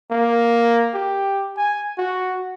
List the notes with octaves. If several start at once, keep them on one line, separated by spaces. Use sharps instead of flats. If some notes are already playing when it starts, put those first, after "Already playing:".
A#3
G4
G#5
F#4